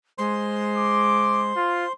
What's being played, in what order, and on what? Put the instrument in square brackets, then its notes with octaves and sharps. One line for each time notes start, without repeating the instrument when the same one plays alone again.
[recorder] G#3 [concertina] C5 C6
[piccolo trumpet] D6
F4